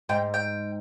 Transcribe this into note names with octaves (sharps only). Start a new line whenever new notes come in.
G#2 G5
G5